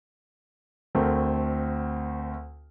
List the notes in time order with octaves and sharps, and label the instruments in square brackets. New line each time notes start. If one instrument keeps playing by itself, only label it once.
[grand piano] D2 A3 C4 A#4